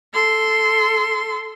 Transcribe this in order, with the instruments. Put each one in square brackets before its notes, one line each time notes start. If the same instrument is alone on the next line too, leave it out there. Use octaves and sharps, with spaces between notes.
[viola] A4 C6